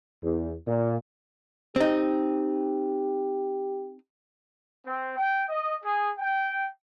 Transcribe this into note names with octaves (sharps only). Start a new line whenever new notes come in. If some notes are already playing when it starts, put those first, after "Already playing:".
E2
A#2
C4 D#4 G4
C4
G5
D#5
G#4
G5